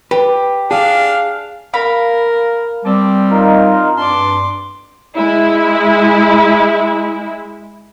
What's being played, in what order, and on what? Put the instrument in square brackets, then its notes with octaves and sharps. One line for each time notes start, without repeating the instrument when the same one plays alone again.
[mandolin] G4 [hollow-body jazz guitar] B4
[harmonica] D4 [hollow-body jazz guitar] G#4 [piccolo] F5
[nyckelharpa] A#4 [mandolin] F5 B5
[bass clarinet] G3 [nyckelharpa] C4 [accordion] A5 D6
[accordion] D#4 F4 A#4
[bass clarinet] G2 [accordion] D4 A5 [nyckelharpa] C6 D6
[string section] G#3 E4